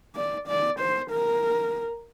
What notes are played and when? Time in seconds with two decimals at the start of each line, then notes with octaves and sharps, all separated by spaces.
0.15 D5
0.48 D5
0.80 C5
1.11 A#4